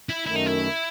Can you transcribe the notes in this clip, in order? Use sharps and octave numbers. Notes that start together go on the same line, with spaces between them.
E4
F#2 D#3 A3 E4
D#4
E4